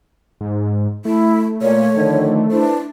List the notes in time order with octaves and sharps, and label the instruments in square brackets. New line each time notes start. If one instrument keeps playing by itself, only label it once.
[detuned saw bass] G#2
[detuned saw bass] A3 [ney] E4
[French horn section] A#2 [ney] C#5
[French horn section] D3 D#3 F3
[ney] D4 [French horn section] E4 B4 C5